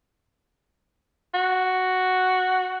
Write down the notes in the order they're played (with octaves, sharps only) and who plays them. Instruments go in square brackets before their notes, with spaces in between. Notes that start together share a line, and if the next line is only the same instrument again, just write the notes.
[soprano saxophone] F#4